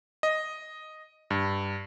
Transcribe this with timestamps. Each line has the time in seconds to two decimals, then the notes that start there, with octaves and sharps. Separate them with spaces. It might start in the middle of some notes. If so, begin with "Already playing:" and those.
0.23 D#5
1.30 G2